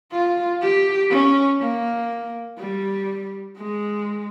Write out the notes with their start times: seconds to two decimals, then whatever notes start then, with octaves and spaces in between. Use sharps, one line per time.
0.12 F4
0.62 G4
1.10 C#4
1.61 A#3
2.59 G3
3.57 G#3